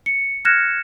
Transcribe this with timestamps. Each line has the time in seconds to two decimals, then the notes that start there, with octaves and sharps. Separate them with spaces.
0.06 C#7
0.45 F6 F#6 G#6 A#6 C#7 E7